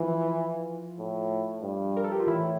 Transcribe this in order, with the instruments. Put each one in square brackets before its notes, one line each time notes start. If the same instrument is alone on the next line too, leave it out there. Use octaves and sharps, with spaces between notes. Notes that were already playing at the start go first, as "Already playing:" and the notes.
Already playing: [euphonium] E3 [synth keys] F3 F4
[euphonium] A2
G2
[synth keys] A#4
A4
G4
F4
[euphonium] A2 [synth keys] E3 E4